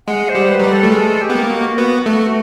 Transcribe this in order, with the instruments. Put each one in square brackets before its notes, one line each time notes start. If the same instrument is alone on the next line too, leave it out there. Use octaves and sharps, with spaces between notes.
[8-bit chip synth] G#3 [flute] F#5
[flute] C5
[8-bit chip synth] G3
[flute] B4
[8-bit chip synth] F#3
G3
[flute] A4
[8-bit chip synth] A3
[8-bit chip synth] G#3 [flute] A4
[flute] G4
[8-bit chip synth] B3
A#3
[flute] F#4
[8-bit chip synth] B3 [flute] F#4
[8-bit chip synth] A3